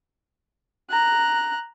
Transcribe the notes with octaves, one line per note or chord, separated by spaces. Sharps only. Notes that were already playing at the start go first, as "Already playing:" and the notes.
A#5 F#6